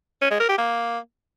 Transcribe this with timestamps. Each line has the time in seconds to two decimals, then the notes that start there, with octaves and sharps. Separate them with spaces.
0.22 C#4
0.31 G#3
0.40 A#4
0.49 G4
0.58 A#3